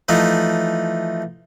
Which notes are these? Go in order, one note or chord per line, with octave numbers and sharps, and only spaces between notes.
E3 F3 A3 D#4